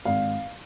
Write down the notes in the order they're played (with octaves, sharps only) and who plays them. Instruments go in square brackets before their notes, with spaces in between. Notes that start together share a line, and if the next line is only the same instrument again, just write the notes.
[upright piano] G#1 F5